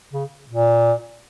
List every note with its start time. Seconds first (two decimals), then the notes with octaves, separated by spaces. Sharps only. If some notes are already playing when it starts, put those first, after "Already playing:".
0.13 C#3
0.50 A#2